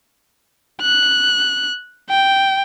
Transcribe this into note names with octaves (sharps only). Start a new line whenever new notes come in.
F#6
G5